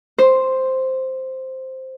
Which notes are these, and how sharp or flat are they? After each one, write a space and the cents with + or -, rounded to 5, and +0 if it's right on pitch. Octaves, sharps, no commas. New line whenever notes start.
C5 +0